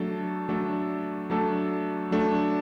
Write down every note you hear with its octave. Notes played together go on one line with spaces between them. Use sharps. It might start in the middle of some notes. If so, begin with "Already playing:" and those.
Already playing: F#3 A3 D4 A4
F#3 A3 D4 A4
F#3 A3 D4 A4
F#3 A3 D4 A4